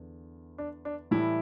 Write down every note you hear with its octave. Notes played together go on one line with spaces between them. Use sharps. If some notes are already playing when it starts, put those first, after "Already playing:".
Already playing: E2 D3
D4
D4
A2 E3 G3 E4